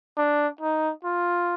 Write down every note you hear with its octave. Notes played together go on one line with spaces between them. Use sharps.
D4
D#4
F4